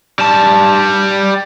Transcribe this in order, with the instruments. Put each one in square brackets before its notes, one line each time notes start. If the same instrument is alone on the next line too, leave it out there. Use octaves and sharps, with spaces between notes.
[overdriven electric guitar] G3 A5